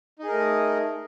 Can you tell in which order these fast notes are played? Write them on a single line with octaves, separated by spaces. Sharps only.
D#4 G#4 A#4 A3